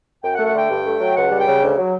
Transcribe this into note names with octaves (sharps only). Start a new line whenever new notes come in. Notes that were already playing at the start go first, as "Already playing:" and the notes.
F#2 G5
F#5
A3
F#5
D3 G5
G2
A3
F#3
C#2 F#5
G3
G5
C#3
D2
F#3